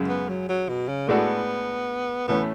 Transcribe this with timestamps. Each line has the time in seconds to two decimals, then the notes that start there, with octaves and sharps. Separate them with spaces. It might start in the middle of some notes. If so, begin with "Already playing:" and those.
Already playing: F#2 C#3 G#3
0.08 B3
0.29 F#3
0.49 F#3
0.69 B2
0.88 C#3
1.08 A2 G#3 B3 D4 F#4 A4
2.28 A2 E3 A3 B3 C#4